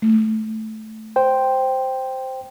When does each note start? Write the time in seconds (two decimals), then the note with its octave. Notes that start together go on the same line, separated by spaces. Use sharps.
0.02 A3
1.16 C5 G5